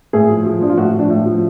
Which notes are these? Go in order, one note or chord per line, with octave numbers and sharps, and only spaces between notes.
A2 G#4
F3
F3
F3 D4
F4
A2 F#4
F3
D4
A2
F3